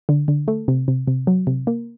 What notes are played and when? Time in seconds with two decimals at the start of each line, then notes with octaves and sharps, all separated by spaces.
0.09 D3
0.28 D3
0.48 A3
0.68 C3
0.88 C3
1.08 C3
1.27 F#3
1.47 C3
1.67 A#3